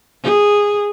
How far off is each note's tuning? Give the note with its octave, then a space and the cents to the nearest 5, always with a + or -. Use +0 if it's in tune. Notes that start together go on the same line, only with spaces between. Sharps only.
G#4 -10